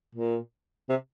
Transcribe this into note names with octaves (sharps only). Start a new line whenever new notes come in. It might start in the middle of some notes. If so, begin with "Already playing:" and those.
A#2
C3